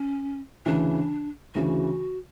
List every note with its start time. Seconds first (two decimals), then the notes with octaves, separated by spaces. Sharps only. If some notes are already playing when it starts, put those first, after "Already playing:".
Already playing: C#4
0.66 D2 C#3 E3 D4
1.55 D2 C#3 E3 F#4